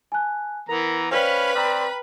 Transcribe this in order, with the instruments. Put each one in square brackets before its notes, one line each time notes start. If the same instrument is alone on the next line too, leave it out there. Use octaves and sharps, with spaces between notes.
[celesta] G#5 A5 F#6
[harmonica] E3 B3 A#5 [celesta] A#4 F7
[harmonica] C#4 F5 [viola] B4 B5 [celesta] C5 D5 G5
[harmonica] C4 D5 [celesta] G5 A#5 F6